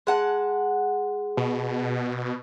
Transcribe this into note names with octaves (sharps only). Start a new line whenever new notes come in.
G#3 F#5 A5
B2